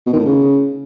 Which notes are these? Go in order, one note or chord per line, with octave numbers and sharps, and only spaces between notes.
B2
D#3
A2
C#3